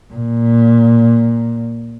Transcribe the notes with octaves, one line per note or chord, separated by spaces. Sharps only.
A#2